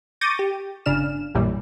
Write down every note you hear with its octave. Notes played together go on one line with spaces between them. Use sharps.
C#6 D6 G6 A6 A#6 D#7
G4
G1 C#3 D4 F6 E7
A#1 F#2 A#2 E3 G3